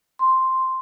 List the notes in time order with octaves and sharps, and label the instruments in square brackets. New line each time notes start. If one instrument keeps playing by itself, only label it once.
[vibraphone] C6